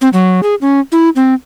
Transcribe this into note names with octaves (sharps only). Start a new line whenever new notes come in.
C4
F#3
G#4
C#4
E4
C4